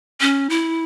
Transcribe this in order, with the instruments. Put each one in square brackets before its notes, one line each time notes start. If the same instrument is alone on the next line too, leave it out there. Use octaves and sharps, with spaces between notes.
[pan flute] C#4
E4